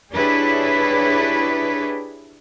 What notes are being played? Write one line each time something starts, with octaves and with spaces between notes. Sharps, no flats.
D4 E4 G4 G#4 B4 C#5